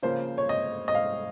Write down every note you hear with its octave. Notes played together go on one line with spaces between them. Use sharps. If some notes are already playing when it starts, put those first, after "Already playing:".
C#3 F3 A#3 C5
C#5
D#5
D#5
F5